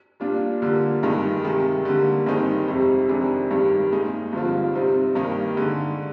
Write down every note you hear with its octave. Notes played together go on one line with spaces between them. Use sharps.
A#2 G3 D4 F4
D3 G3 A#3 F4
G2 D#3 G#3 D#4
C3 D#3 G#3
D3 G3 A#3
G2 D#3 G#3 C4 D#4
F2 C3 G3
F2 C3 D#3 G#3 D4
G2 D#3 G3
A#2 G#3 D#4
G2 D3 F3 C4 F4
C3 G3 C4 D#4
G2 D#3 A#3 D#4
D3 G#3 D#4